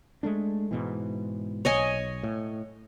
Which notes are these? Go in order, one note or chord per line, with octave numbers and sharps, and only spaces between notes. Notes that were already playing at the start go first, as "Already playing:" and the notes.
G#3 A3 D4
G#2 B2 E3
B1 C#5 D#5 G#5
A2